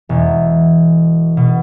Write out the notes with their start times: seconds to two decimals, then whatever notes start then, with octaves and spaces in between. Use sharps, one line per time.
0.09 E1
1.37 B2